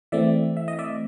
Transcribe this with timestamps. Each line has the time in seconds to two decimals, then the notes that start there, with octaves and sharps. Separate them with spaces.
0.12 E3 A3 C4 D5 E5
0.57 E5
0.68 D#5
0.79 D5 E5